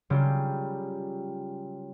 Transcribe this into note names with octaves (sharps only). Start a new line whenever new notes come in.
C#3 F#3 G3 F4 G4